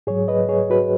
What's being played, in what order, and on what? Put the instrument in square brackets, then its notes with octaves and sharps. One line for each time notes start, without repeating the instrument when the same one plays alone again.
[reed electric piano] G#2 F#3 G#4 C#5
B4 D#5
G#4 C#5
F#4 B4